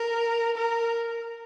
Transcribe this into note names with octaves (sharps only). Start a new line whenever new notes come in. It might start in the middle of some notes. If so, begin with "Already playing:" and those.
Already playing: A#4
A#4